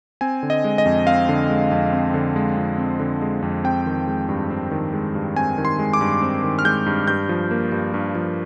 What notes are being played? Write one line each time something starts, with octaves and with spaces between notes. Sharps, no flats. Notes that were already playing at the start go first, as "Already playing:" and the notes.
C4 G#5
D3
D#5
G#3
D#5
F2
C4 F5
D3
G#3
F2
C4
D3
G#3
F2
C4
D3
G#3
F2
C4 G5
D#3
G#3
G2
C4
D#3
G#3
G2
C4 G#5
D#3
C6
G#3
D6
G2
C4
D#3
F6
G#3 G6
G2
G2 G6
F3
A#3
G2
G2
F3